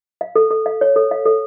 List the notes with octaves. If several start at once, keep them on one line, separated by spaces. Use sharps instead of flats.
F5
A4
A4
F5
C#5
A4
F5
A4